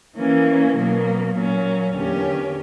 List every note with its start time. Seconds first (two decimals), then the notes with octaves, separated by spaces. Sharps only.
0.17 E3 A#3 C#4
0.76 B2 F#3 A#3
1.34 A#2 F#3 A#3 C#4
1.94 E2 D3 A#3 C#4 G4